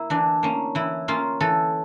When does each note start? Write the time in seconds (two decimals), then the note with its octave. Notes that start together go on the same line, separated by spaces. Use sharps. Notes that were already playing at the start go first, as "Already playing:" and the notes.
Already playing: A#3 E4
0.10 E3 D4
0.43 A#3 C#4
0.75 E3 E4
1.08 A#3 C#4 F4
1.40 E3 A4